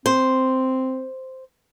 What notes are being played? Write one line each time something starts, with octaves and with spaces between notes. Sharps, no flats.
C4 C5